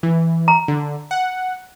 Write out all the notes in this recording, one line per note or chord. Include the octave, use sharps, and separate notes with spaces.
E3
A#5
D3
F#5